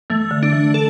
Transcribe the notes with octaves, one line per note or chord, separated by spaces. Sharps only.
E3 A3
D3
D4
E3
A4